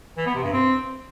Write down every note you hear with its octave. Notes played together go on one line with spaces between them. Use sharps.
E3
B3
C3
G2
C4